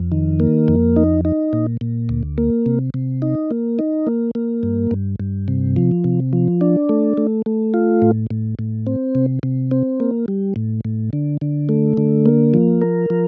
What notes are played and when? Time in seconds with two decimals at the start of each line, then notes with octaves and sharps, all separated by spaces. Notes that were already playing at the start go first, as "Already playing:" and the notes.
Already playing: F2
0.12 D#3
0.40 A#3
0.68 F2
0.96 D#4
1.25 D#4
1.53 A#2
1.81 A#2
2.09 D2
2.38 A#3
2.66 C3
2.94 C3
3.22 D#4
3.51 A#3
3.79 D#4
4.07 A#3
4.35 A#3
4.63 G2
4.91 G2
5.20 G2
5.48 C3
5.76 F3
6.04 C3
6.33 F3
6.61 D4
6.89 A3
7.17 A3
7.46 A3
7.74 F4
8.02 A2
8.31 A2
8.59 A2
8.87 C4
9.15 C3
9.43 C3
9.71 C4
10.00 A#3
10.28 G3
10.56 A2
10.85 A2
11.13 D3
11.41 D3
11.69 A3
11.97 D3
12.26 A#3
12.54 F3
12.82 A#4
13.10 F3